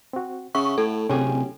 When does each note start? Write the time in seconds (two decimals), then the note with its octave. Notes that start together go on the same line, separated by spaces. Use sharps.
0.13 C4 F#4
0.55 C#3 E5 F#5 C#6
0.78 A2 A4
1.10 D1 C3 C#4 G4 G#4